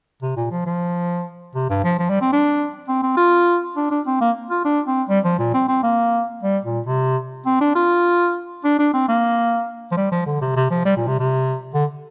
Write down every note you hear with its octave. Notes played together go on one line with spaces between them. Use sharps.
C3
A#2
F3
F3
C3
G2
F3
F3
G3
C4
D4
C4
C4
F4
D4
D4
C4
A#3
F4
D4
C4
G3
F3
A#2
C4
C4
A#3
G3
A#2
C3
C4
D4
F4
D4
D4
C4
A#3
F3
G3
F3
D3
C3
C3
F3
G3
A#2
C3
C3
D3